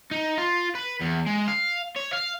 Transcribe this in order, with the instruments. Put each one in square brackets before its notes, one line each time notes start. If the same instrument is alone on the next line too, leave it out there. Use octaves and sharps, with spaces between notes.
[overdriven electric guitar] D#4
F4
B4
E2
G#3
F5
C#5
F5